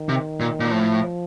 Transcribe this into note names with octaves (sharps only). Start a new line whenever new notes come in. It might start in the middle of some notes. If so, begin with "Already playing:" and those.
Already playing: D#3
C3
A#2
A#2
A2 F3